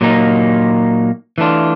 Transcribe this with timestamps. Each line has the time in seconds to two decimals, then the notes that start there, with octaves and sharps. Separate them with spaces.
0.01 A#2 F#3 A#3 D#4
1.38 E3 A3 D4 F4